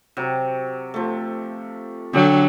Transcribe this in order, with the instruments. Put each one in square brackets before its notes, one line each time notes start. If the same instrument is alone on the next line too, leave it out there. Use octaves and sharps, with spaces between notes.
[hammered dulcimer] C3 F#3
F3 A3
[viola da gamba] D3 F#3 [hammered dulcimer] G4